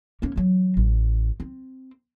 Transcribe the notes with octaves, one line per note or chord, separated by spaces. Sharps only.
A#3 C#4
E3 F#3
A1
C4